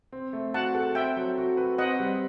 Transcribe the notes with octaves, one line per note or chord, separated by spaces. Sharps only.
C4
A3
F#4 F#5 A5
A4
C4 E5 G5
F#3
F#4
B4
C4 D#5 F#5
G3